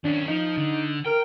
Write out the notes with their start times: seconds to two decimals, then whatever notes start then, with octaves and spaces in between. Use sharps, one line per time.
0.04 D#3 C#4 D4
0.28 F3 D#4
0.57 D3
1.06 A#4 G5